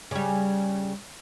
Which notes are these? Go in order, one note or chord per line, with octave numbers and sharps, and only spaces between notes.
C#3 G3